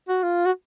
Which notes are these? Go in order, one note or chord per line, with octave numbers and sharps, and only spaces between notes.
F#4
F4
F#4